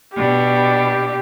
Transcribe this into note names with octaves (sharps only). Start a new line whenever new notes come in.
B2 D4 G4